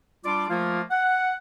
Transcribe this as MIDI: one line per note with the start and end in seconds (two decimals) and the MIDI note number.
0.25 0.48 55
0.25 0.48 62
0.25 0.48 65
0.25 0.48 74
0.25 0.48 84
0.25 0.48 86
0.50 0.81 53
0.50 0.81 57
0.50 0.81 58
0.50 0.81 65
0.90 1.34 78